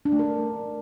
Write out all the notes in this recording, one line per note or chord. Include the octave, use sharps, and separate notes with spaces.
D4
A3
A#4